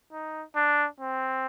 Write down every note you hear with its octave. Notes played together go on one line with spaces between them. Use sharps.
D#4
D4
C4